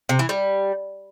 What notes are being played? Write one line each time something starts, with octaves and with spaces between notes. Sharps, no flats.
C3
E3
G3